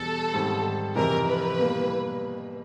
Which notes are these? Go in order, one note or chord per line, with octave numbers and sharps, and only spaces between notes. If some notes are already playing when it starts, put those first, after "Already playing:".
Already playing: E2 B2 G3 A4
G#2 D#3 G3 C4
F2 C3 E3 A#4
B4
B2 G3 A#3